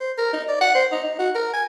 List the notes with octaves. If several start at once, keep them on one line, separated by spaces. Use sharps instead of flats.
C5
A#4
D#4
D5
F#5
C5
D#4
D#4
F#4
A#4
G#5